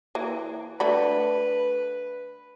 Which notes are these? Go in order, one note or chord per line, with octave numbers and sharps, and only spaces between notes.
E3 A#3
D3 A3 B4 B5